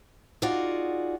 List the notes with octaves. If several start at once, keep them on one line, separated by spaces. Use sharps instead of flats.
D#4 F4 F#4 G#4 D5 F#5